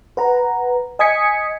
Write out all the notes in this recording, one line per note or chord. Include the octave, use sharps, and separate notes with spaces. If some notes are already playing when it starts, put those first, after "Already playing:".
B4 F#5 A#5
D#5 G#5 D#6 G#6 B6 C#7